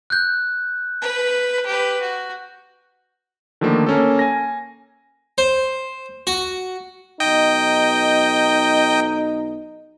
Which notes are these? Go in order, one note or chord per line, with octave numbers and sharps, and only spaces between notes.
F#6 G6
B4
G4 B4
F#4
D3 D#3 F3 A3 A#3
A#3 C#4 A4
G#5 A#6
C5
F#4
B1 D#4 D#5 G5